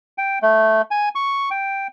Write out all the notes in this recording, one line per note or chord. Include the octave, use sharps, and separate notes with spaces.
G5
A3
G#5
C#6
G5